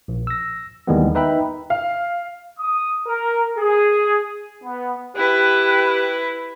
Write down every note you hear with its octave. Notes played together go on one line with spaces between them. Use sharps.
A#1
E6 A#6
D#2 D#3 E3 G3 G#3 B3
D#4 B4 E5 G5 B5
F5
D#6
A#4
G#4
B3
E4 G4 B4 F#6